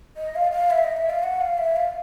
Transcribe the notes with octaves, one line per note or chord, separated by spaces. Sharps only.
D#5
F5
F5
E5
D#5
E5
F5
F#5
F5
E5
F5